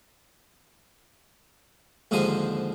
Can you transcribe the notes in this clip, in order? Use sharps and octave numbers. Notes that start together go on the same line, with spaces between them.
D#2 G#2 D3 F3 C5 G#5